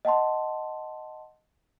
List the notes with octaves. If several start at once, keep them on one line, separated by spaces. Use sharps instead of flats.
D#5 F#5 A5 C6